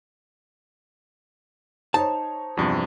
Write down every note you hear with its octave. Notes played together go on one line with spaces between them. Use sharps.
D#4 C5 C#5 A5
E2 G2 C3 F3